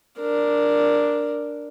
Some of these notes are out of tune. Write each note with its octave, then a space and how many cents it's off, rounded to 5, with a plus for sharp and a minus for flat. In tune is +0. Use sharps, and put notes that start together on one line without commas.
D4 +0 A#4 +0